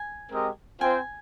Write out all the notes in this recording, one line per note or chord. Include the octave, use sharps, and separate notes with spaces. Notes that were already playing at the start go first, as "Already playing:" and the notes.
Already playing: G#5
G#3 C4 G4 A#4 D#5
C4 F4 C5 G5 G#5